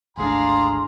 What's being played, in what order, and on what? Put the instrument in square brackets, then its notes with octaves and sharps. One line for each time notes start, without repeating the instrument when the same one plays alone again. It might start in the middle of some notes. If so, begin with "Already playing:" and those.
[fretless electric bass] G#1 D2 A2 [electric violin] D4 G#4 [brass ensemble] F5 A#5 [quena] C6